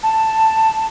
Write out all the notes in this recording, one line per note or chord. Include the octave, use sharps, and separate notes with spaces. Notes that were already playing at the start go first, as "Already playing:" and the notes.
A5